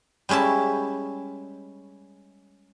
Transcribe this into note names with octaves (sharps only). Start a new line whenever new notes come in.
G3 G#3 C#4 E4 A5